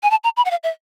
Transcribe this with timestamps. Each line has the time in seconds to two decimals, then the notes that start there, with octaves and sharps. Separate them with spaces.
0.03 G#5
0.11 A5
0.24 A#5
0.37 B5
0.45 F#5
0.51 F5
0.64 E5